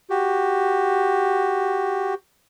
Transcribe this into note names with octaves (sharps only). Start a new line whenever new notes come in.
F#4 G4